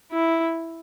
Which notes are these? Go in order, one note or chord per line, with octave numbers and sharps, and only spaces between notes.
E4